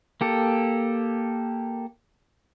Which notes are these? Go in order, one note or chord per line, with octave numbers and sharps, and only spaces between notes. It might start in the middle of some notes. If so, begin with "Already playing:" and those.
A#3 G4 A4